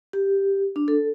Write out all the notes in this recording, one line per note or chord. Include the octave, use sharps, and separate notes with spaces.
G4
D4
A4